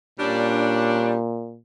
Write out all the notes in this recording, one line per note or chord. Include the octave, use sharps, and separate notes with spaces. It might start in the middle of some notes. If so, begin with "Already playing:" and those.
A#2 G3 C#4 D4